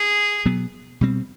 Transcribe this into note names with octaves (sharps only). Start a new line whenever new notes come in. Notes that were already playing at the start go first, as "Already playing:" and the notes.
Already playing: G#4
B2 F#3 B3
B2 G3 C4